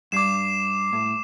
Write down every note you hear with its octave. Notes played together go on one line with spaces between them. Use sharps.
G2 D6 C7 E7
A2